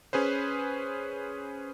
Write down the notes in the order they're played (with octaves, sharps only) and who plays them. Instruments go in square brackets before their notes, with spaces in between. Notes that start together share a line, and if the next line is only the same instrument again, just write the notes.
[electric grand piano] C#4 G#4 B4 C5